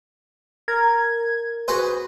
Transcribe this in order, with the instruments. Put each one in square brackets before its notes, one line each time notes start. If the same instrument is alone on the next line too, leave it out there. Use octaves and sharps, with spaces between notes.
[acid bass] A#4 [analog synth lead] G#6
[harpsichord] F#4 G#4 C5 [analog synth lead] B4